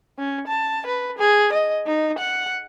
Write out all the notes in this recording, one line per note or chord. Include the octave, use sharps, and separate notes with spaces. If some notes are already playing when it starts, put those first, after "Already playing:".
C#4
A5
B4
G#4
D#5
D#4
F#5